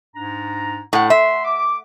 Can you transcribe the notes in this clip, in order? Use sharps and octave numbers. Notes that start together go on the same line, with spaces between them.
G#2 D4 A#5
A2 F#5
E5 C6
D6